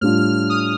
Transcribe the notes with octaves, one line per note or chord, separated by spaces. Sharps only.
A2 G3 D4 F4 F6
F6
F6
D#6